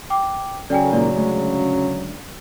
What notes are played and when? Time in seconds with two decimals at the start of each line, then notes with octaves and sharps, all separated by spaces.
0.10 G5 D6
0.70 C#3 F#3 A4 D5 G5 G#5
0.93 A#2 D#3 G#3 D5
1.16 D2 G#3